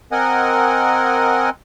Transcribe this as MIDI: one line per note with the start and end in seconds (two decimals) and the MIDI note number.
0.12 1.50 60
0.12 1.50 70
0.12 1.50 75
0.12 1.50 78
0.12 1.50 80